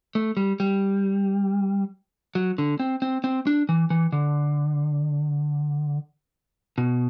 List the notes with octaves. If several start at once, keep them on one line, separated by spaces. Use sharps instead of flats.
A3
G3
G3
F#3
D3
C4
C4
C4
D4
E3
E3
D3
B2